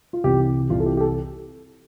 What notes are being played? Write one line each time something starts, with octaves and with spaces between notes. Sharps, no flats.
F4
C2 C3 E3 G4
C2 C3 E3 F4
A4
G4
G4
A4